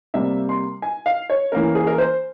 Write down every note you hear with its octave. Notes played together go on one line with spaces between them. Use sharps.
C3 G3 A#3 E5
C6
G#5
F5
C#5
E3 A#3 C#4 A#4
G#4
A#4
C5